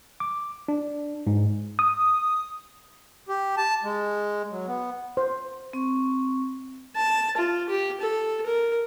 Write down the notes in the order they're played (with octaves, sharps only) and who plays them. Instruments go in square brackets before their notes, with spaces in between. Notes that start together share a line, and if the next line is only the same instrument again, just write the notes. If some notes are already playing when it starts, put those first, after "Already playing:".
[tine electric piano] D6
D4
G#2
[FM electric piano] D#6
[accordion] G4
A5
G#3
F#3
B3
[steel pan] C5
[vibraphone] C4 C#6
[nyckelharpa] A5
F4
G4
A4
A#4